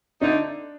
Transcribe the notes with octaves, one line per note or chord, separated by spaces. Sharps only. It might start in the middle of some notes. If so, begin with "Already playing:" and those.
D3 A3 D4 D#4